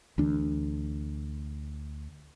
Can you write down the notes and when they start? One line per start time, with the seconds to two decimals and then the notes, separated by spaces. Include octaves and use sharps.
0.18 D2 E3 D4